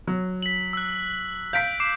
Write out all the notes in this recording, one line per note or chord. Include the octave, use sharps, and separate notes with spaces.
F#3
B6 F#7
E6 F#6
F5 G6 B6 D7
D6 C7 E7